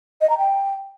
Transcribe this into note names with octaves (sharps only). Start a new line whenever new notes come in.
D#5
A#5
G5